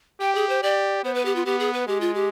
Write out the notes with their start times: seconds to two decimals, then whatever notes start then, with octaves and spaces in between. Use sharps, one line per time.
0.21 G4 G5
0.35 G#4
0.49 C5
0.63 G4 D5
1.04 B3 C5
1.14 B4
1.25 G4
1.36 F4
1.45 B3 G4
1.59 G#4
1.73 B4
1.87 G#3 G4
2.01 F4
2.15 G4